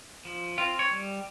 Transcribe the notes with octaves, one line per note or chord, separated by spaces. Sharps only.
F3
C4 F4
C#5
G3